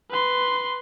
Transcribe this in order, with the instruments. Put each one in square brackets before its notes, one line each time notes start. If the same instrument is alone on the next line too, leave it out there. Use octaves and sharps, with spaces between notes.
[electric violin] B4 C6